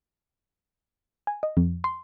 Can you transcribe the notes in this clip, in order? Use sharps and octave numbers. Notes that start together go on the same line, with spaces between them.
G#5
D#5
F2
C6